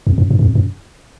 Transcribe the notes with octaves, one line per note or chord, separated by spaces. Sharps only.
F2
F#2
G2
F#2
F2
F#2